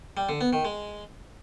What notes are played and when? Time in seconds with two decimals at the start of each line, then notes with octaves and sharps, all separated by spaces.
0.17 G3
0.29 D3
0.41 B3
0.53 D#3
0.65 G#3